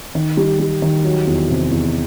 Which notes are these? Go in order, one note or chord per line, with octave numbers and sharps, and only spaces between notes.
D#3
G3
G3
D#3
F#3
E2
C3
E2